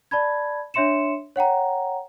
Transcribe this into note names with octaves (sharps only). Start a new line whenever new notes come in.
D5 A5 B5 G#6
D4 C#5 E5 C6 C#7 E7
C#5 F#5 G5 A#5